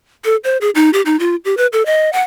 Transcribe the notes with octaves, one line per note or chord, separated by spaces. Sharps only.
A4
C5
G#4
D#4
G4
D#4
F4
G4
B4
A4
D#5
F#5